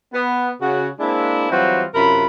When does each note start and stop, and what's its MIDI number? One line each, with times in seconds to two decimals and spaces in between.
0.14 0.50 59
0.61 0.87 49
0.61 0.87 66
1.00 1.48 56
1.00 1.48 58
1.00 1.48 60
1.00 1.48 62
1.00 1.48 64
1.51 1.84 52
1.51 1.84 54
1.51 1.84 55
1.51 1.84 60
1.51 1.84 65
1.51 1.84 66
1.94 2.26 42
1.94 2.26 48
1.94 2.26 65
1.94 2.26 70
1.94 2.26 71
1.94 2.26 83